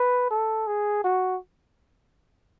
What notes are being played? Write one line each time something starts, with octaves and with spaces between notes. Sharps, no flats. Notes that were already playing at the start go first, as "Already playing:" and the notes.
Already playing: B4
A4
G#4
F#4